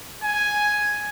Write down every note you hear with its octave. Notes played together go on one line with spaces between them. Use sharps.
G#5